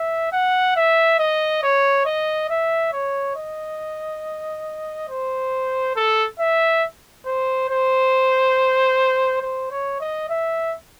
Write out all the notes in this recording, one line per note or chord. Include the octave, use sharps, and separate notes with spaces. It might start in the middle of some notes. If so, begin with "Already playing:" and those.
Already playing: E5
F#5
E5
D#5
C#5
D#5
E5
C#5
D#5
C5
A4
E5
C5
C5
C5
C#5
D#5
E5